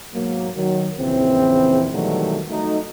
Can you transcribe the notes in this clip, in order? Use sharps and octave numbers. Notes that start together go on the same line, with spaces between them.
G#2 B2 F#3 A#3
D#3 F#3
A#1 E2 C#3 E3 C4
B2 D#3 E3 F#3 G3 A3
F#3 A3 D#4